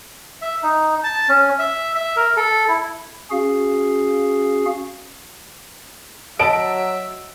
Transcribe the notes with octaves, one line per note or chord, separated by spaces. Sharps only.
E5
D#4
A5
C#4
E5
E5
A#4
A4
E4
C#4 F#4 G#4 F5
F#3 D#5 E5 A5 B5 D7